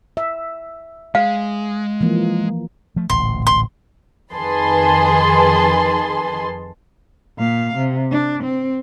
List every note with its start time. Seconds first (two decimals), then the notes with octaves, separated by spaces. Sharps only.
0.17 E5
1.15 G#3 F5
2.01 E3 F3 A#3
2.96 F3 A3
3.10 D1 A1 A#2 C6
3.47 C6
4.33 F2 D#3 G#4 B4 A5 C6
7.38 A#2 F5
7.77 C3
8.11 D4
8.43 C4